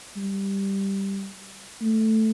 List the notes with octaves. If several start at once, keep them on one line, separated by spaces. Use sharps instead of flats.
G3
A3